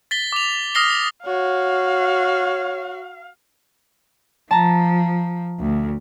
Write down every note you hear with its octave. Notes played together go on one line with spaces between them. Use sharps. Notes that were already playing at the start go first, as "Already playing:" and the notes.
A6 B6 G7
D6 F7
D#6 F6 A#6 C7 G7
F#4 C#5 F5
F3 A5 A#5
D2